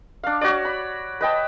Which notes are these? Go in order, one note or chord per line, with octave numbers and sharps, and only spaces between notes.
D4 F5
F#4 C#5 D5
B5
B4 D#5 G5 A5